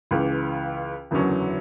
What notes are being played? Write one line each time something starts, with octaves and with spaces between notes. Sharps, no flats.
C#2 C#3 E3
F#1 E2 D3 F#3 C#4